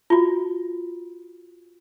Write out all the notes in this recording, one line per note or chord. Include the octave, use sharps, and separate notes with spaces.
F4 F#4